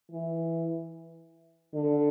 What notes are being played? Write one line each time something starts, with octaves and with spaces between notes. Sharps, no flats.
E3
D3